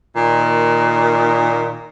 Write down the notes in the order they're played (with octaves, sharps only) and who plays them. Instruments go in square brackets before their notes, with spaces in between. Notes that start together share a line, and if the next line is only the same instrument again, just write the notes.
[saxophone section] A#2 D#3